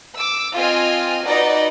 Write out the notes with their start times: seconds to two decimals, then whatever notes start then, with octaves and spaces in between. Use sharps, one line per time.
0.15 D6 E6
0.56 C4 F4 D#5 G#5 F6
1.26 D#4 F#4 B4 D5 D#5